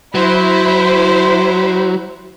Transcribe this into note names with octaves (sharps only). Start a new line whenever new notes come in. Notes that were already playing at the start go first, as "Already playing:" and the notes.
F#3 E4 C5